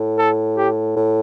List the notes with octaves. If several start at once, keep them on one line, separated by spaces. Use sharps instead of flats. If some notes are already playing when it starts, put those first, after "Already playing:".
Already playing: A2
A4
G4
A2